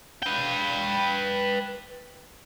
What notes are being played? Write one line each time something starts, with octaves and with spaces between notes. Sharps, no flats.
B4 G5